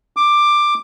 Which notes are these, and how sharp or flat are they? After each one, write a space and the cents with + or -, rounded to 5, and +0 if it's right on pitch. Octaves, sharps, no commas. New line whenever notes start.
D6 +10